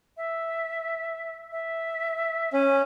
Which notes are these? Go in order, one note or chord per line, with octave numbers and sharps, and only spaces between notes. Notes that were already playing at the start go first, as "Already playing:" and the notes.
E5
E5
C#4 G#5